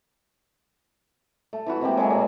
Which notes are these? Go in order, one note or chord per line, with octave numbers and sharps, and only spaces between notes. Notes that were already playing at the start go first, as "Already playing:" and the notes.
A3
E3 E4 F#4
C3 G#3 A#3 G4
F#3 G#3 A3 G#5
B2 A#3 D5